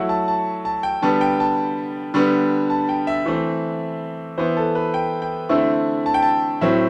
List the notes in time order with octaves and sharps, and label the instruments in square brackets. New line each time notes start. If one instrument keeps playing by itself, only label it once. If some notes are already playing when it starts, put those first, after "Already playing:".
Already playing: [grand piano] F#3 A3 E4 F#5
A5
A5
A5
G5
D3 G3 B3 A5
G5
A5
D3 G3 B3
A5
G5
E5
E3 A3 C4
E3 B3 E4 C5
A4
B4
G5
G5
D3 A3 C4 E4
A5
G5
A5
A2 F#3 C4 E5